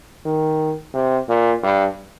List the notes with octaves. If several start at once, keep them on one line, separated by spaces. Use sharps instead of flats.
D#3
C3
A#2
G2